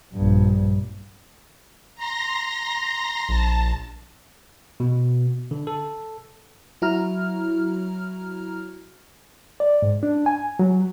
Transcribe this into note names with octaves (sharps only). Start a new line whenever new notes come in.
A#1 G2
A#5 C6 A#6
A#1 A5
B2
D3
A4
F#3 E4 F#4 A#5 F6
D5
G#2
D4
G#5
F#3